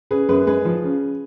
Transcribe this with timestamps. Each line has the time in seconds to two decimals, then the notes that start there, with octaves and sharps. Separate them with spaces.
0.11 C#3 G#4 B4
0.29 F#2 G#4 B4
0.47 G#3 G#4 B4
0.65 F3
0.83 C#3